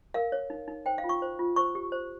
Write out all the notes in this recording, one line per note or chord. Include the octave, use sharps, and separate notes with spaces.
A#4 F5
C#5
D#4
D#4
C5 G5
F5
F4
C#6
C5
F4
C5 C#6
G4
C5